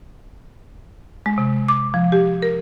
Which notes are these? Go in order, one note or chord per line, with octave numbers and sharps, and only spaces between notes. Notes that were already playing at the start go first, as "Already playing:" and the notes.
G#3
C3
D6
F3
G4
A#4